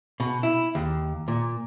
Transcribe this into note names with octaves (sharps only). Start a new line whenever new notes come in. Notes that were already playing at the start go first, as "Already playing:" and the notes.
B2
E4
D#2
A#2